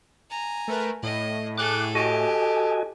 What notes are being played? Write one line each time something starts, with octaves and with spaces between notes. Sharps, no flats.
G#5 A#5
A3 A#4 B4
A2 D#5
G#4 A4 D6 F#6
F#4 G4 A4 D#5 G#5